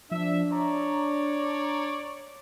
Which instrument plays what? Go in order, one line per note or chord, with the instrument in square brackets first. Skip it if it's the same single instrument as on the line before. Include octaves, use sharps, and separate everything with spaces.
[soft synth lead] F3 [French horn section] D4 [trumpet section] E5
[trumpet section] C#5 D5 [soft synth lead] A#5